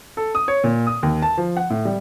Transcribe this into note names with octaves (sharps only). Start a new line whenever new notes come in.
A4
D#6
C#5
A#2
D#6
D#2
A5
F3
F#5
A2
G3